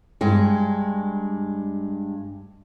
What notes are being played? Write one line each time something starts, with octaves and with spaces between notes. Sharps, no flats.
G2 G#3